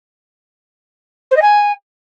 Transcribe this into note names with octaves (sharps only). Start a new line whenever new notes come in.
C5
D#5
G#5